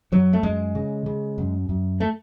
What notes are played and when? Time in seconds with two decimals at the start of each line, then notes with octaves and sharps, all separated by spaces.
0.12 F#2 F#3
0.33 A3
0.43 F#2 G#3
0.75 C#3
1.06 C#3
1.38 F#2
1.69 F#2
2.00 A3